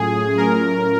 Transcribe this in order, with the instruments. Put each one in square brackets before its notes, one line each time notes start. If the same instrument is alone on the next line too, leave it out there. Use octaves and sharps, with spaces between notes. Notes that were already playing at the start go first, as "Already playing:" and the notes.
Already playing: [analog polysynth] A2 F#3 A3 C#4 F4 [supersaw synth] G#4
[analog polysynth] A2 F#3 A3 C#4 F4 [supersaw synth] A#4